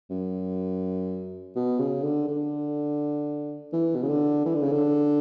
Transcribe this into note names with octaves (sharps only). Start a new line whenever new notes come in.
F#2
B2
C#3
D3
D3
E3
B2
C#3
D3
E3
D3
C#3
D3